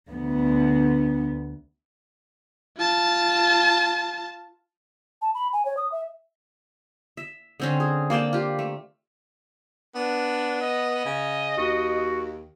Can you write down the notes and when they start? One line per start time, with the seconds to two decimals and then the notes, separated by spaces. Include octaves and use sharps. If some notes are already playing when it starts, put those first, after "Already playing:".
0.10 D2 B3
2.77 F4 A5
5.22 A5
5.35 B5
5.53 G#5
5.65 C#5
5.77 D#6
5.92 E5
7.17 E5
7.60 D3 C4 C#4
7.80 G#4
8.10 A#3 D5 G5 A5
8.33 F4 G4
8.59 A3
9.96 B3 D4
10.61 D#5
11.05 C#3
11.58 D#2 F#4